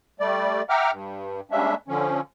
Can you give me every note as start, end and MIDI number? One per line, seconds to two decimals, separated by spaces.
0.20 0.62 55
0.20 0.62 57
0.20 0.62 74
0.69 0.91 76
0.69 0.91 78
0.69 0.91 79
0.69 0.91 82
0.69 0.91 86
0.69 0.91 89
0.91 1.41 43
1.51 1.75 55
1.51 1.75 56
1.51 1.75 58
1.51 1.75 61
1.51 1.75 62
1.51 1.75 76
1.88 2.21 50
1.88 2.21 53
1.88 2.21 61